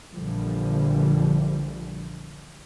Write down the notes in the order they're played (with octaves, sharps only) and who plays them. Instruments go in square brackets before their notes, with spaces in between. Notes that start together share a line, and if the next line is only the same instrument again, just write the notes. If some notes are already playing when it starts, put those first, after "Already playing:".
[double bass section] A#1 D3 E3 F3 G3